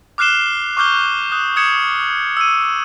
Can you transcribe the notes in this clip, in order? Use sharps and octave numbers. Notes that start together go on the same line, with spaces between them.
D6 F6 F#6 C7 E7 G7
C#6 D6 F6 G6 G7
D#6 F#6
D#6 G#6 C#7 E7
E6 D#7